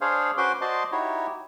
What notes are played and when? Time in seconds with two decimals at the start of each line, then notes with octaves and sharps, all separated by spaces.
0.01 D4 G#4 C5 C#5 F5
0.37 C#4 F#4 B4 C5 C6 D6
0.61 F#4 C5 D5 D#5 A5 C6
0.92 D#4 E4 F#4 G4 C#5